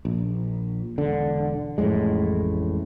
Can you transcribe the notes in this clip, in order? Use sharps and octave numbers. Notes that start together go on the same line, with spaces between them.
A#1
E1 D3
A1 F2 A2 G#3